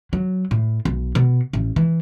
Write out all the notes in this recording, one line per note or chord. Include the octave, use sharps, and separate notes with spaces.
F#3
A2
B1
B2
A1
E3